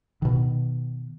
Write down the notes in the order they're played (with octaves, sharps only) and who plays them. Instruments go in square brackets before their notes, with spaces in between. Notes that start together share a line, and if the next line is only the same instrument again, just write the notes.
[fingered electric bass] B2 D#3